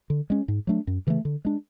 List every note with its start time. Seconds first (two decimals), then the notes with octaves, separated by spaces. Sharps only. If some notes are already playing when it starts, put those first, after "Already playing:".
0.10 D3
0.30 G#3 C#4
0.48 G#2
0.67 F#3 A3 D4
0.87 F#2
1.07 C#3 E3 A3
1.25 D3
1.45 G#3 D4